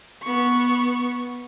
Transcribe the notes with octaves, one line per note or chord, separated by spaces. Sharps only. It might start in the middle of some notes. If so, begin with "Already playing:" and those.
B3 C#6